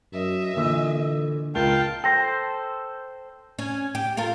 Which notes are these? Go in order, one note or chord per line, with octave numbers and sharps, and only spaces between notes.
F#2 D#5 E5
A#2 D3 E3 E6
C#2 F4 A#4 F5 G5 A5 G7
A4 C5 G5 A#6
C#4
G4
F4 A4 A#4